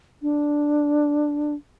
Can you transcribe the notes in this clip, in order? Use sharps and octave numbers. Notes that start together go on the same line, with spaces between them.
D4